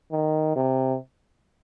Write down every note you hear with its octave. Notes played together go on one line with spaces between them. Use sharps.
D#3
C3